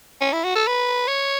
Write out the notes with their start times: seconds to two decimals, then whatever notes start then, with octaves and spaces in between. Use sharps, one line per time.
0.21 C#4
0.33 E4
0.44 F#4
0.56 A4
0.67 B4
1.08 C#5